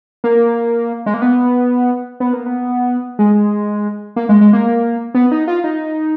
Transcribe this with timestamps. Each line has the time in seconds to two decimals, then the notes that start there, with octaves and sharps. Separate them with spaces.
0.24 A#3
1.06 G#3
1.14 A#3
1.22 B3
2.20 B3
2.33 A#3
2.46 B3
3.19 G#3
4.16 A#3
4.29 G#3
4.41 G#3
4.53 A#3
5.14 B3
5.32 D#4
5.48 F4
5.64 D#4